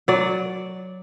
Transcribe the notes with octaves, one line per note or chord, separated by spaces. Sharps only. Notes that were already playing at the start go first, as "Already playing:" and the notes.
F#3 D5